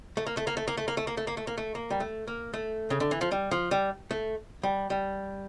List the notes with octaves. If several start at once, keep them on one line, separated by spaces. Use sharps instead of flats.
A3
A#3
A3
A#3
A3
A#3
A3
A#3
A3
A#3
A3
A#3
A3
A#3
A3
A#3
G3
A3
A#3
A3
C#3
D3
E3
F3
G3
F3
G3
A3
G3
G3